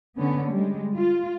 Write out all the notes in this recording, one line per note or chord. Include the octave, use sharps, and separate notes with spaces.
D3 B3 C#4
G3 G#3
F4